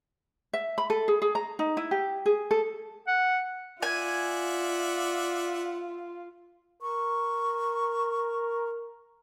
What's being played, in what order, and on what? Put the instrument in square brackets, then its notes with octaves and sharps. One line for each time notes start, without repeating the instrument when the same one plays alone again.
[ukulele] E5
B5
A4
G#4
G#4
A#5
D#4
E4
G4
G#4
A4
[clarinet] F#5
[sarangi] F4 [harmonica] D5 E5 F#5 [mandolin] G#5
[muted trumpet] A#4 [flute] C#6